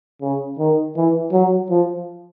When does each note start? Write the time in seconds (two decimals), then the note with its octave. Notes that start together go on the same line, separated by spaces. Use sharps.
0.22 C#3
0.59 D#3
0.97 E3
1.32 F#3
1.70 F3